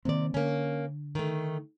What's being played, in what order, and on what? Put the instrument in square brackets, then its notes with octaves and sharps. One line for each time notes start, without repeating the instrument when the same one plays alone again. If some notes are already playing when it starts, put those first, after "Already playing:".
[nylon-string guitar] C3 D5 [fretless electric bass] D#3 A#3 C4
[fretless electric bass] D3 [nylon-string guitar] A#3 C#4
[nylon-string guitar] D#3 A3